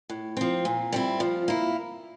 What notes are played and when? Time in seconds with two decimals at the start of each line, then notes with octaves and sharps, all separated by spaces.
0.10 A2
0.37 F3 C4
0.65 A#2
0.92 G3 C4 E4
1.20 F3
1.48 A#3 E4